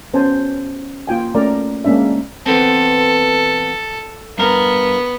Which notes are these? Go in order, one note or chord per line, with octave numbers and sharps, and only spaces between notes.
B3 C#4 C5 G#5 A5
A#3 F4 G5 G#5
A3 C#4 A#4 D5 A#5
G#3 A#3 C#4 D4 E5
E3 B3 C4 A4
G2 B3 A#4